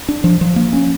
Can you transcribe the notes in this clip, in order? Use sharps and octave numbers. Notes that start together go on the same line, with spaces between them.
D4
F3
F3
A#3
C#4